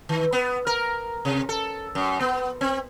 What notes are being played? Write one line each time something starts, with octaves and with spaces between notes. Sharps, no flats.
D#3
B3
A#4
C3
A4
F#2
B3
C4